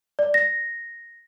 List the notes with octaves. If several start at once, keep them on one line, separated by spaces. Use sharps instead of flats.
D5
A#6